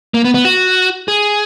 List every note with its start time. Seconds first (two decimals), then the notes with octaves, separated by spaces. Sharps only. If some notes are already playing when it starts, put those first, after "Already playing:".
0.14 A#3
0.24 B3
0.34 B3
0.45 F#4
1.08 G#4